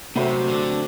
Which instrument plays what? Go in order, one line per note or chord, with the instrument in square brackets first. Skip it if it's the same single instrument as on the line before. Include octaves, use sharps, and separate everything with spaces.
[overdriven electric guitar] C3 [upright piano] F#3 A3 C4 F#4 C5
[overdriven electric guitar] D3